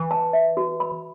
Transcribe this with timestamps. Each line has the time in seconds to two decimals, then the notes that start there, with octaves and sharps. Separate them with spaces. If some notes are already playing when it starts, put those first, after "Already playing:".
Already playing: E3
0.11 A5
0.33 E5
0.57 F#4
0.80 B5